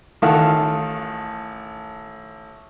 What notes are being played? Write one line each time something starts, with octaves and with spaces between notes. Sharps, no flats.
A1 D#3 F4 A4 F5 F#5